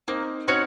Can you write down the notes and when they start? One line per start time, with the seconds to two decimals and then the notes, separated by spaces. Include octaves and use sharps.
0.08 A#3 C4 D#4
0.47 C4 C#4 D#4 F#4 C#5